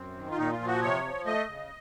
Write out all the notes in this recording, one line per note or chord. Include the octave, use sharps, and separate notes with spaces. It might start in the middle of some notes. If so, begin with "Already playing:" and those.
Already playing: F#2 C4
D#3
F4
A#2 D#4
F4
F3
F#4
C3 C#5
F3
A3 D#5
C#3